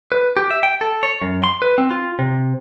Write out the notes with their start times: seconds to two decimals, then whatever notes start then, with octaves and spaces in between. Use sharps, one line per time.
0.12 B4
0.37 G4
0.51 E5
0.63 G5
0.81 A4
1.03 C#5
1.22 F#2
1.44 C6
1.62 B4
1.78 C4
1.91 F4
2.19 C3